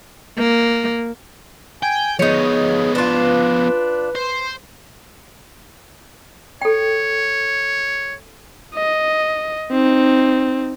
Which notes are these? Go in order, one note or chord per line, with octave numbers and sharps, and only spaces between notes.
A#3
G5 G#5
F3 B3 D#4 G#4 C#5
D4 F4 B4
C5
A4 C#5 G5
D#5
C4 D#4